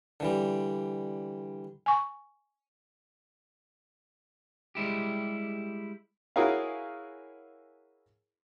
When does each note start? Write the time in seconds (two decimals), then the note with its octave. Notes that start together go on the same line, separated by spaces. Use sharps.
0.20 D3 E3 G3
1.86 G#5 C#6
4.75 G3 G#3 E4 G4
6.36 E4 F#4 G#4 A#4 C#5 F5